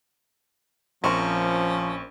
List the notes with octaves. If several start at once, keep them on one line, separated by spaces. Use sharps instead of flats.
A#1 F3 C4 C#4 A#4 C#6